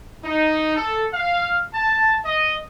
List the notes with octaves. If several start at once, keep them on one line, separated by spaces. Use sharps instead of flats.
D#4
A4
F5
A5
D#5